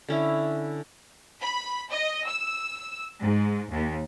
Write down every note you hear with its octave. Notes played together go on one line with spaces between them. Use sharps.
D3 C#4 E4
B5
D#5
E6
G#2
D#2